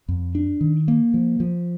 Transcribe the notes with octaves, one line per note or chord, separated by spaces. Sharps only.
F2
D4
D#3
A#3
F3
F3